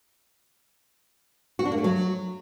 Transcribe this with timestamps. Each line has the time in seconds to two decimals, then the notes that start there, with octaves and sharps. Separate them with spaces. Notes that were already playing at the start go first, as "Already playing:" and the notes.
1.59 F#4
1.65 D4
1.72 A#3
1.78 A3
1.84 F#3